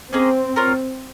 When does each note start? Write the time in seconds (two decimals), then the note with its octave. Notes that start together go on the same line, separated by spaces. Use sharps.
0.13 A#3 C4 C#4 G#4 D#5
0.56 F4 A#4 C#5